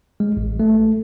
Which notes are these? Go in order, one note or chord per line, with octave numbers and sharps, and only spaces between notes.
G#3
A1
A3